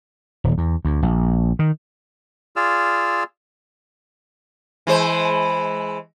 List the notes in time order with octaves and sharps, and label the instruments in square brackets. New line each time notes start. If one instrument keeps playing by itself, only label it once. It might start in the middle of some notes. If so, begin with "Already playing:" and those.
[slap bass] D#1
E2
D2
A#1
D#3
[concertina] F4 G#4 D5 E6 F6
[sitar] E3 G#3 C5